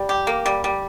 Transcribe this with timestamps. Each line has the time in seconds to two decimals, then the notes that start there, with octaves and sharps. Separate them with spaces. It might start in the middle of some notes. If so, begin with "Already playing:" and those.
Already playing: G3
0.09 G4
0.27 A#3
0.46 G3
0.64 G3